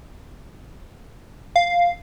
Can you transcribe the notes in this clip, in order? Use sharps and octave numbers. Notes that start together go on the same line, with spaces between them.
F5